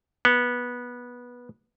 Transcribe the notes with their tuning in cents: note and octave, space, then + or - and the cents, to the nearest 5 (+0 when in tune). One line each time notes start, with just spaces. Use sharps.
B3 -15